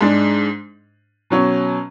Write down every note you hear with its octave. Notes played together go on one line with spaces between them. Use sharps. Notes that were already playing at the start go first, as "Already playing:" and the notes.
G#2 G#3 D4
B2 F#3 C#4